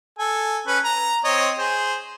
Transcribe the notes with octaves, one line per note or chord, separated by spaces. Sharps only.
A4 G#5
C#4 B4
A#5
C4 C#5 D#5
G#4 C5